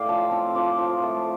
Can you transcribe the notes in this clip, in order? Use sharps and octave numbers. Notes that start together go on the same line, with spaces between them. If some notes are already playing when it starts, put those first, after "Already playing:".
Already playing: A2 D5 F5 G5
F3 A5
C4
F3 D6
F3
A3